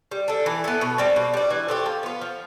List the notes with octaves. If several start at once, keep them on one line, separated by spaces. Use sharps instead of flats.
G3
D4 A4
E3
B3 E4 A4
B2
G3 C4
B2
G3 D4
E3
A3 C4 G4
F3
B3 F4
F3